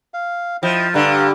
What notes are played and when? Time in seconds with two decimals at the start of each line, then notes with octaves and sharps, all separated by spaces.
0.14 F5
0.63 F3 E4 D#5 G5
0.94 G2 D3 B4 F5 A#5